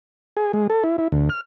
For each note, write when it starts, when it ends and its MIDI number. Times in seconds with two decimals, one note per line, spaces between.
0.37 0.52 68
0.53 0.67 56
0.70 0.83 69
0.84 0.96 64
0.98 1.08 64
1.12 1.29 38
1.29 1.41 89